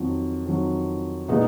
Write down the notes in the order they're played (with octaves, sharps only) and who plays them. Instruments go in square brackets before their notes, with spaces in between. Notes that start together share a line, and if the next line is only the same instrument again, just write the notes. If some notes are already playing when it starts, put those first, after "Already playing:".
Already playing: [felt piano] F2 D#3 F#3
F2 D#3 F#3
A#2 G#3 B3 D#4